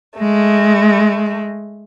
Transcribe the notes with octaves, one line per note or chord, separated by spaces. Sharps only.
G#3 A3